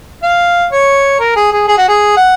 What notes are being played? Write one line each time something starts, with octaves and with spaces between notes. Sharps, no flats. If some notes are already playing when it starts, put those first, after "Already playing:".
F5
C#5
A#4
G#4
G#4
G#4
F#4
G#4
F#5